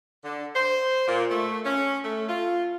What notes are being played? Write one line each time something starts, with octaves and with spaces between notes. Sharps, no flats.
D3
C5
A#2
A3
C#4
A3
F4